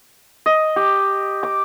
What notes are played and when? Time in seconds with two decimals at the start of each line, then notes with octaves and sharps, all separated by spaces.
0.46 D#5
0.76 G4
1.43 D6